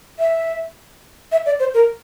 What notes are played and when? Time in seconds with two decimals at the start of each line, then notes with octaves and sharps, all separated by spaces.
0.19 E5
1.32 E5
1.46 D5
1.60 C5
1.74 A#4